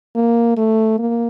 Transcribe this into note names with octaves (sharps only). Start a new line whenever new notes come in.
A#3
A3
A#3